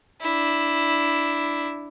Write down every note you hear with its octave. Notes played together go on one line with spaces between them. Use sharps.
D4 E4